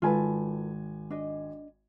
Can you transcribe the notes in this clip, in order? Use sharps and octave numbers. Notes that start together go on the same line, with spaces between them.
G#1 F4 A4 B4 G#5
D4 D#5